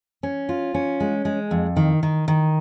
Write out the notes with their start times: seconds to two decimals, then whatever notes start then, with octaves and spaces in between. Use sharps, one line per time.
0.23 C#4
0.49 F4
0.74 C#4
1.00 G#3
1.25 G#3
1.51 F2
1.77 D#3
2.03 D#3
2.28 D#3